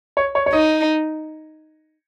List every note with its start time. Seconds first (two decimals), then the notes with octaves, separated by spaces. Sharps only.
0.17 C#5
0.35 C#5
0.46 C#5
0.53 D#4 D#5